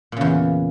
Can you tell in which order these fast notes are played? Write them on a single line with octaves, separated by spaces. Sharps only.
A#2 C#3 E2